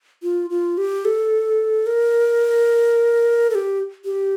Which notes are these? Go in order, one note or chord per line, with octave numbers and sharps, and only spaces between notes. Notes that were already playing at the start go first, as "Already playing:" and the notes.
F4
F4
G4
A4
A#4
A4
G4
G4